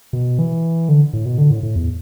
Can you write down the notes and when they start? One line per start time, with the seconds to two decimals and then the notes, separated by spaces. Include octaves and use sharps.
0.13 B2
0.39 E3
0.89 D3
1.13 A2
1.25 B2
1.38 D3
1.51 A2
1.63 A2
1.76 E2